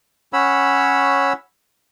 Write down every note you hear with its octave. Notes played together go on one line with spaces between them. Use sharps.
C#4 C#5 F#5 B5 E6